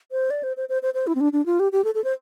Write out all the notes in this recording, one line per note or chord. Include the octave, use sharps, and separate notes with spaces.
C5
D5
C5
C5
C5
C5
C5
E4
C4
D4
D4
F4
G4
G4
A4
A4
C5